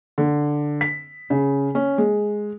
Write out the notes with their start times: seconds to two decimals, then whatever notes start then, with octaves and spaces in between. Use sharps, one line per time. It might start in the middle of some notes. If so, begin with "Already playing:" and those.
0.18 D3
0.81 B6
1.30 C#3
1.75 C#4
1.98 G#3